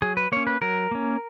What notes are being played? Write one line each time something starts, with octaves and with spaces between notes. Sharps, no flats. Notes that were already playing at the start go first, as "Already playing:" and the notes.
F#3 G#4
B4
A#3 C#4 C#5
B4
F#3 A#4
A#3 C#4